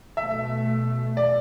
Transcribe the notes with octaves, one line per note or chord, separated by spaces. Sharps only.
B2 A3 E5
D5